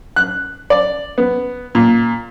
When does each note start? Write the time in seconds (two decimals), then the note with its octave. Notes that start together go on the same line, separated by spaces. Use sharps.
0.16 F#6
0.70 D5
1.18 B3
1.75 A#2